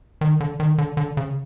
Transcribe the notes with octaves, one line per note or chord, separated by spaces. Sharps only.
D#3
D3
D#3
D3
D3
C#3